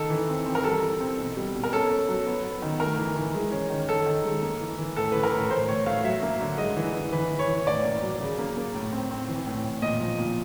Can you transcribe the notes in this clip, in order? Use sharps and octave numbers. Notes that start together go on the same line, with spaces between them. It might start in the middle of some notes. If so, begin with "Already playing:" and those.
Already playing: D#3 A4
E3
C4
C4
A#4
G3 A4
E3
C4
B2
G3
B2
A#4
C#4 A4
C#4
F#3
B3
B3
D#3
A3 A#4
E3
E3
G#3
C#4
D#3
D#3 A4
D#3
G#3
A#3
E3
E3
A2 A4
E3 B4
A#4
A2
A2 C5
A2 C#5
A3 F5
F#3 E5
A#3
D3
G#3 D#5
E3
E3
E3 B4
E3
C#5
E3
A2 D5
A#3
F#3
C#3
A#3
A#3
A2
C4
C4
E3
A2
A2
A#2 D#5
F3
A#2